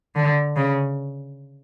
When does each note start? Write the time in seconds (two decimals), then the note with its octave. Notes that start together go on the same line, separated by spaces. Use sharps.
0.15 D3
0.56 C#3